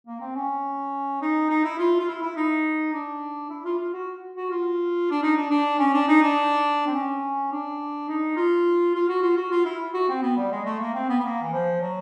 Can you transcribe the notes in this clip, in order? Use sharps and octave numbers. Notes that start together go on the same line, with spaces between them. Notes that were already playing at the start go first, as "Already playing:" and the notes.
A#3
C4
C#4
D#4
D#4
E4
F4
F4
E4
E4
D#4
D4
E4
F4
F4
F#4
F#4
F4
D4
D#4
D4
D4
C#4
D4
D#4
D4
C4
C#4
D4
D#4
F4
F4
F#4
F4
F#4
F4
E4
F#4
C4
B3
G3
G#3
A3
A#3
C4
B3
B3
A#3
E3
F3
F#3